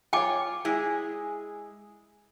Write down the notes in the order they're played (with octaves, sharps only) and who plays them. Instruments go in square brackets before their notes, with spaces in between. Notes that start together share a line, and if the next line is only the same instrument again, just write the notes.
[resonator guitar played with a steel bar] F4 C#5 [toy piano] G5 G#5 D6
[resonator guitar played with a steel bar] G#3 E4 G#4